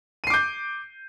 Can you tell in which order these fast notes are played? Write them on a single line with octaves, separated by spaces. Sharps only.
D#7 C7 D6 G6